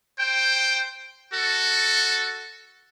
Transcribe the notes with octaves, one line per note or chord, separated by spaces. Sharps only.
C5 G5
F#4 A4